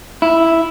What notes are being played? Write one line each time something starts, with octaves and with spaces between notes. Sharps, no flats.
E4